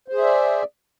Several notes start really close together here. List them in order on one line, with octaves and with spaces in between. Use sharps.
C5 G#4 E5 D5